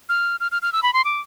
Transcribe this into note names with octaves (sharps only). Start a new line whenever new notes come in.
F6
F6
F6
F6
E6
B5
C6
D6